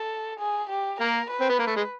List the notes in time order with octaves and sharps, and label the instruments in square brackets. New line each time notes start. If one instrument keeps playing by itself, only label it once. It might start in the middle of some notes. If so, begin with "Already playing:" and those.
Already playing: [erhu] A4
G#4
G4
[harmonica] A#3 [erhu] A#4
[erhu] B4
[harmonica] C4
B3
A#3
A3
G#3